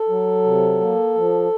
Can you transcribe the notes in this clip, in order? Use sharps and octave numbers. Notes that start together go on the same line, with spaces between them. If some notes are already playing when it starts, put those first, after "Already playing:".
Already playing: A4
F#3
C3
A#3
F3